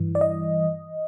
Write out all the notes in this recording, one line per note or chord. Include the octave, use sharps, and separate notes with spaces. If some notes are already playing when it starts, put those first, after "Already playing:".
Already playing: G2 E3
D5
D#5